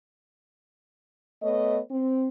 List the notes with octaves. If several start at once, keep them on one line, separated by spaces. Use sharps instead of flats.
A3 B3 C#5 D#5
C4